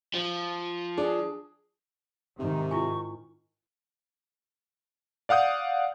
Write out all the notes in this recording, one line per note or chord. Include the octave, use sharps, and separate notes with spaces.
F3
D4 G#4
G#2 C3 D#3 D#4
E4 F4 G#5 C#6
D5 F5 F#5 D#6 G6